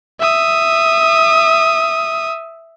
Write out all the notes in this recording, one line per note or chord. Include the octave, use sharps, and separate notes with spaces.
E5 D#6